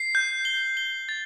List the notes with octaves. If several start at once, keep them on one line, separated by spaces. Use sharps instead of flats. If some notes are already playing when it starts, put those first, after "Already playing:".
Already playing: C7
G6
G7
G7
A6